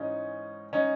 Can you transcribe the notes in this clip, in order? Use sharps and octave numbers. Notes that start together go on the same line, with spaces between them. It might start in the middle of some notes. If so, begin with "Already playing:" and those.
Already playing: G#2 E3 G#3 C#4 D#4
C#4 D#4